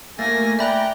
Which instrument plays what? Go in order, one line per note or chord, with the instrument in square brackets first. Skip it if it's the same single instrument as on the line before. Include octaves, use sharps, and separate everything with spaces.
[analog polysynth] A3 A#3 [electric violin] G#5 A#6 [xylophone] A6
[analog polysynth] D5 A#5 [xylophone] E5 B5 F#6 [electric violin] G5